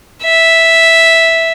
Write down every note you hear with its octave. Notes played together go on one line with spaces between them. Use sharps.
E5